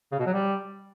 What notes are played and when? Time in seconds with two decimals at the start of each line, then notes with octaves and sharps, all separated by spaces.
0.12 C#3
0.19 B2
0.26 F#3
0.33 G3